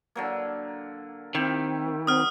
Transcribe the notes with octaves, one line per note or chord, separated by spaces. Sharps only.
D3 F#3 A#3
D#3 C4 E4 G4
F#3 C4 D#6 F6